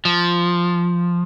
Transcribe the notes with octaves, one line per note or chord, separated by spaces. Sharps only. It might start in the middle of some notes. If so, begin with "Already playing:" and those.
F3